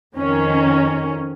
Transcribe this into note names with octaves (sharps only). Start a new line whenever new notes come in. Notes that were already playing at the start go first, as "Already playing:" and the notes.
F2 D#3 C#4